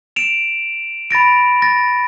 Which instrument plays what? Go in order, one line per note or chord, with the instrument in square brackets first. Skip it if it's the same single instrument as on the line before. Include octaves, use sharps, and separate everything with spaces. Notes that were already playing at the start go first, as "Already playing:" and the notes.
[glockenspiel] D7 E7 F7
B5 A6 A#6 D7
A6 A#6